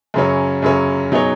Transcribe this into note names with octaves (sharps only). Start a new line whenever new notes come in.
F#2 C#3 F#3 C#4
F#2 C#3 F#3 C#4
B2 F#3 D#4 G#4 C#5